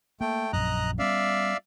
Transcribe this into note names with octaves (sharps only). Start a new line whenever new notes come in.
A3 A#3 G5
A#1 F#2 D#5 A#5 F#6
G3 B3 C#4 D5 E5 F5